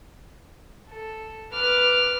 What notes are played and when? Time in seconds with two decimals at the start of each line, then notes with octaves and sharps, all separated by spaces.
0.90 A4
1.52 B4 D6 F6